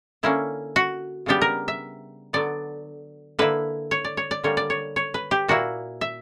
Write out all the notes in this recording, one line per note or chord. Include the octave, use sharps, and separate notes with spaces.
D3 A#3 C#4 E4
F#4
C#3 G3 B3 D4 G4
A#4
E5
D3 F#3 B3 D5
D3 A#3 E4 B4
C#5
D5
C#5
D5
D3 G3 A#3 C#5
D5
C#5
C#5
B4
G4
A#2 A#3 E4 F#4
E5